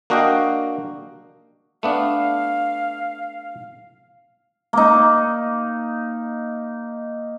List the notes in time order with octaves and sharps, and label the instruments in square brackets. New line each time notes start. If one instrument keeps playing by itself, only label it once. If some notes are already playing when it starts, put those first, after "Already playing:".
[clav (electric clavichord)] A#3 D4 F#4 D#5 F5 G5
[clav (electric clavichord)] A3 B3 D4 [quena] F5
[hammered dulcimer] A#3 D#4